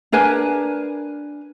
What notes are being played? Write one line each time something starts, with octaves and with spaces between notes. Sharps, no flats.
D4 A#4 B4 G#5